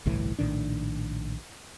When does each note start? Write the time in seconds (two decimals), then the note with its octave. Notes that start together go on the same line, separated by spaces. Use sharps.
0.06 G1 C2 A2 E3
0.39 A#1 A2 D#3 D4